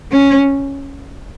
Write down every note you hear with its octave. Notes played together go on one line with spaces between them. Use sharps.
C#4